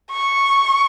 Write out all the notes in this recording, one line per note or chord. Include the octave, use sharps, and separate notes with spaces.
C#6